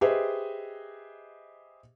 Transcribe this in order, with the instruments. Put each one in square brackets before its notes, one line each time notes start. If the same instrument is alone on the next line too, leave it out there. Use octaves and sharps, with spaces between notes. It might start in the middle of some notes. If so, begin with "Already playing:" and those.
[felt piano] G4 G#4 B4 C5 D#5 E5